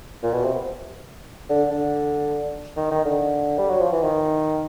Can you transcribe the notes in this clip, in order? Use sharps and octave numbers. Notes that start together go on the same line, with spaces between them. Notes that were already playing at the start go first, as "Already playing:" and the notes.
A#2
B2
C3
D3
D3
D#3
D#3
D3
G3
F#3
F3
E3
D#3